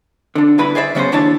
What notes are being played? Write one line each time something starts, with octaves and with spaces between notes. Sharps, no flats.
D3 D4
G2 B2 D3 E4 B4 B5
G#4 C5 D5 E5
C#3 F#3 B3 C#4 G#4 C5
D#2 D4 E4 C#5 A5